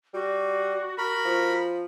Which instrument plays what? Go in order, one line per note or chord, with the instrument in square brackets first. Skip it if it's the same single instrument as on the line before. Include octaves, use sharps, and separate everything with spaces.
[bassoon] G3 [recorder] F#4
[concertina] A#4 B5
[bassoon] F3